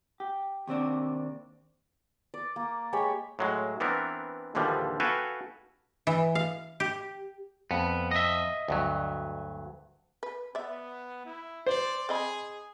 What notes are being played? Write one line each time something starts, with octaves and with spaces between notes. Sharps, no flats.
G4
D#2 C3 C4 D4
D5
A#3
G#3 G4 C#5 B5
A2 F#3 G#3
E3 B3 C4 D4 A#4
A#1 D#2 D3 E3 F3 G3
F#4 A4 B4 F5 G5 G#5
E3
F5
G4
F2 B3
D#5 E5
D2 G2 F#3
B4
B3 D5 E5
E4
C5 D5
C4 G#4 D#5 B5